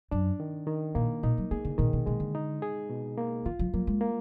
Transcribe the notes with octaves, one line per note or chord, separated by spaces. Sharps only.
F#2 D4
D#3
D#3
A#2 A#3
A#2 D#4
F#3
A#3 G#4
D3
A#2 D#3
B2
B2 G#3
D3
D#4
G#4
B2
A#3
D#3 F4
F3
F#3 A#3
G#3
A#3